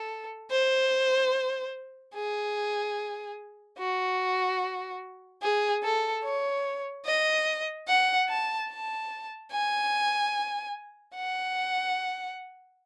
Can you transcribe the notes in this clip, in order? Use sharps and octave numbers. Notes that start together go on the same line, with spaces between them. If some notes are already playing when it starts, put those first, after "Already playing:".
Already playing: A4
C5
G#4
F#4
G#4
A4
C#5
D#5
F#5
A5
A5
G#5
F#5